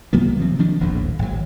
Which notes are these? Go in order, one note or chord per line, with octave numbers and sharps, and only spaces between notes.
C2 F#3 A#3 B3
C3 D#3 F3 C4
D#3 F3 F#3 D4
D#1 A#1 E2 A2
G#1 F#3